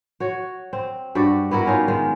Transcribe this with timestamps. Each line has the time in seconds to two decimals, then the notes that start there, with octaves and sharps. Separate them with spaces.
0.20 F#4 C#5
0.73 C4
1.15 G2 F#4 G4 D5
1.51 B3 E4 F#4 A#4
1.66 G3 C#4 D#4 F4
1.88 D#3 G#3